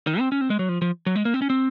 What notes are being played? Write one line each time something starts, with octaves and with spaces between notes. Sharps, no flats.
D#3
C4
C#4
C4
G#3
F#3
F3
F3
F#3
G#3
A#3
C4
C#4
C4